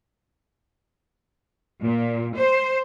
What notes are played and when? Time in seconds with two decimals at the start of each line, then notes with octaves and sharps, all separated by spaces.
1.81 A#2
2.36 C5